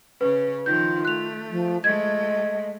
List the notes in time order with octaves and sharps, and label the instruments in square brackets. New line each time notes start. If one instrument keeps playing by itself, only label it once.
[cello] C#3 C#4 [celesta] B4
[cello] D#3 F3 [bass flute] F4 [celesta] G6
[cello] A3 [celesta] F#6 F7
[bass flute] F3
[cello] G#3 A3 [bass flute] D#5 [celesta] G#6